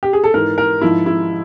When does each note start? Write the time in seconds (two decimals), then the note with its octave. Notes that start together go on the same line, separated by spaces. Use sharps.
0.03 G4
0.13 G#4
0.24 A4
0.34 G#2 E3 A#4
0.58 A#4
0.82 G#2 F3 E4
1.06 E4